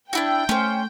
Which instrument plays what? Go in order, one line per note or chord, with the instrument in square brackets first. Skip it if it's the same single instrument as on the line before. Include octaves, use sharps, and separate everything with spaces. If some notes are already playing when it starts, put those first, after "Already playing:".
[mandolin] D4 E4 F#4 [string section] G5
[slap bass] A3 [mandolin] C#4 C5